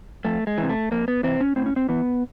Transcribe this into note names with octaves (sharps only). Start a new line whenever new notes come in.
F2 A3
G#3
C3 E3
A3
F2 A#3
B3
C3 E3 C4
C#4
A2 C4
C#4
C4
E3 B3